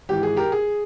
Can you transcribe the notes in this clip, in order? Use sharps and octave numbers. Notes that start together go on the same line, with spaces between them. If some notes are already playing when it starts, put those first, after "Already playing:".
G#1 G#2 E3 G4
G#4
G4 A#4
G#4